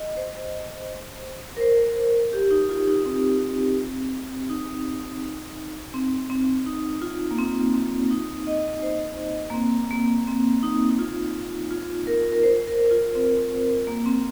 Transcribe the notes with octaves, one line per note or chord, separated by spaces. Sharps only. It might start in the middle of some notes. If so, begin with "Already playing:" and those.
Already playing: D#5
C5
A#4
C5
G4
D#4
F4
D#4
C4
D#4
C4
C4
D#4
F4
A#3
C4
C4
D#4
D#5
C5
A#3
C4
A#3
C4
D#4
D#4
F4
F4
A#4
A#4
C5
A#4
F4
C4
A#3
C4